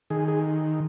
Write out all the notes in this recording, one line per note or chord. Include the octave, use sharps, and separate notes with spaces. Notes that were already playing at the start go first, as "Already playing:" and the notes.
D#3 G#4
G#4